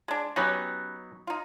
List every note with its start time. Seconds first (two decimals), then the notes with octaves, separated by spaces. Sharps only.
0.08 G#3 D4
0.36 F#3 B3 C#4 D#4 G4 B4
1.27 D#4 F4